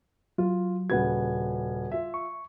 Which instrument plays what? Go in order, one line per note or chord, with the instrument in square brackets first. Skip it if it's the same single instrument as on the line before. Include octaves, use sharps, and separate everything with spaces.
[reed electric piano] F#3 [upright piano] F4
[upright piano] D#1 C#3 G#6 [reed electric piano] F#4 B4 F#5
[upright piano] F4 E5
[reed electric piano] C#6